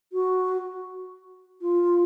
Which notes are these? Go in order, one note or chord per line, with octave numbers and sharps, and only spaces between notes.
F#4
F4